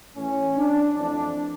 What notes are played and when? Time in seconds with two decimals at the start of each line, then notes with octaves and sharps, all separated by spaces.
0.16 A2 E3 A3 C#4
0.57 D4
0.98 F2 E3 A3 D4